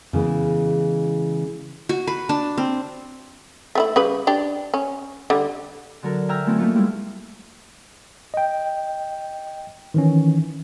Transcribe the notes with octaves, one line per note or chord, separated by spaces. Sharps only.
C#3 E3 G#3 B3
F#4
B4
D4
C4
A3 C4 E4
C#3 G3 B4
D4 G4
C#4
D3 G3
D3 F#3 A4 A#4
E5 G5 G#5 A#5 F6
F#3 A3 B3 C4 E4
A3 A#3 D#4 F4 C#6
G3 G#3 E4
D#5 G5
D#3 E3 C#4